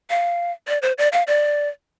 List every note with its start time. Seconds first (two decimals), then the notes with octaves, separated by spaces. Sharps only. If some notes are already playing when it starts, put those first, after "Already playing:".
0.10 F5
0.68 D5
0.82 C5
0.98 D5
1.13 F5
1.27 D5